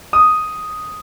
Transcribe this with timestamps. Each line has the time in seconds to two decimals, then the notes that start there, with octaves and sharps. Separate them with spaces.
0.13 D#6